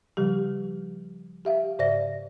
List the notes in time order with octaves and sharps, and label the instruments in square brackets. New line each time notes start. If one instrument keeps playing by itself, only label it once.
[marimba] C#3 F3 G3 G4
G4 E5 F5
G#2 C#3 C5 D5 E5 A#6